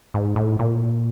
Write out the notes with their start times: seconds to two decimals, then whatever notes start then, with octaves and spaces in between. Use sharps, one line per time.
0.14 G#2
0.36 A2
0.59 A#2